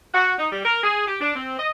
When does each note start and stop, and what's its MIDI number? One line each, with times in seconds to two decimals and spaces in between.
0.14 0.33 66
0.39 0.47 63
0.52 0.62 55
0.65 0.82 70
0.84 1.05 68
1.08 1.18 67
1.21 1.33 62
1.36 1.55 60
1.59 1.69 75